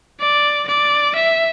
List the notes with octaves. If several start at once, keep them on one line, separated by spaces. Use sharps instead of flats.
D5
D5
E5